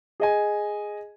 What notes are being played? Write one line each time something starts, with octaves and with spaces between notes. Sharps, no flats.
G#4 D#5 G#5